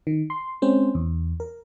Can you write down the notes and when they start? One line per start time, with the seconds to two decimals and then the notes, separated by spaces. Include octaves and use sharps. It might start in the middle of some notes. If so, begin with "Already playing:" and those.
0.07 D#3
0.30 C6
0.62 G#3 C4 C#4 C5
0.95 E2
1.40 A#4